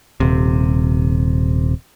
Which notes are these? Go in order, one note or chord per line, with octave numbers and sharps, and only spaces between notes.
D#1 C3